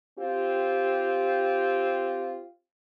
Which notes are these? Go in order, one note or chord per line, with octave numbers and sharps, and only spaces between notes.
C4 F4 G4